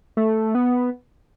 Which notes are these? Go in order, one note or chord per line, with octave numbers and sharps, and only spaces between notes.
A3
B3